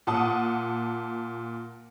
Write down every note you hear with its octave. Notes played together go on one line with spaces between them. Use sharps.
A#2 F#5 A5 D#6